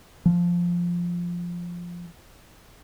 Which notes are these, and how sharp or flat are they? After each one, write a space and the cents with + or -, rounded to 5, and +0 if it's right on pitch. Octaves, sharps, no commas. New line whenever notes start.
F3 +0